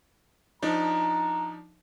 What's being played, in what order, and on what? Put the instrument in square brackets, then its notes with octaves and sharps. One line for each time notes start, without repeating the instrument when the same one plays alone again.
[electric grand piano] F3 D4 D#4 [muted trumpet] A#5